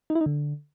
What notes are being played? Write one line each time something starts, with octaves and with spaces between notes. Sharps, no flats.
D#4
E4
D#4
D3